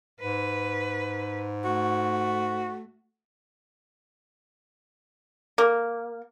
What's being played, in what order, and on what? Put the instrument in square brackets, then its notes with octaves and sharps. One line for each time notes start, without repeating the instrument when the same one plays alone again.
[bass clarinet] G#2 [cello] B4
[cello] A3 [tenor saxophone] F#4
[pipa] A#3